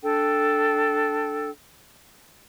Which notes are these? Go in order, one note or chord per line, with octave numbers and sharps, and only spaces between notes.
D4 A4 G5